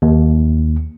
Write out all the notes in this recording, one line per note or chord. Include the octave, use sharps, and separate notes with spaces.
D#2